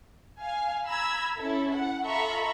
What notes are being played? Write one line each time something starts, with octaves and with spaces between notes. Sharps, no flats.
F5 G#5
A#5 B5 E6 G#6
C#4 E4 A4
F#5
F4 A4 E5 A#5 B5 C#6